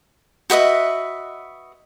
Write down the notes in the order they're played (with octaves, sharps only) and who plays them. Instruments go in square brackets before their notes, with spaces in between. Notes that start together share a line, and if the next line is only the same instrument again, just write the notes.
[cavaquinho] F#4 B4 D#5 E5